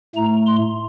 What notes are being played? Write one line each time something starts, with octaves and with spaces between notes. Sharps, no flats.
A2 A3 A#5
C6